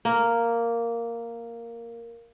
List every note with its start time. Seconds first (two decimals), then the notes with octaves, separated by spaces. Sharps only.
0.05 A#3 A#4